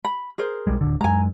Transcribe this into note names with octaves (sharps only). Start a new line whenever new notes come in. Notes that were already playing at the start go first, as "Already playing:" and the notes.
B5
G#4 A#4 C5
B1 G3 G#3
D1 C#2 D3
F#2 G#3 G#5 A#5